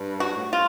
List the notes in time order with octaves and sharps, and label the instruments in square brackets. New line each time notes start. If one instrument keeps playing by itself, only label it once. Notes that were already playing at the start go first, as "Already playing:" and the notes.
Already playing: [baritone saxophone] G2
[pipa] F#4
[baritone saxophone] A2
[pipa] F4